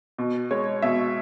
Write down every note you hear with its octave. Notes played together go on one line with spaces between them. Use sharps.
B2
G#3 C#5
B2 E5